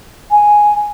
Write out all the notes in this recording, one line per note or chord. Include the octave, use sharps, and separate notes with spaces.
G#5